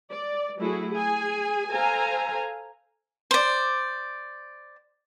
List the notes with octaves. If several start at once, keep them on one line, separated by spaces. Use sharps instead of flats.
D5
F#3 A3 E4 F#4 G#4
G#4 G#5
A4 C5 F5 G#5 A#5
C5 D5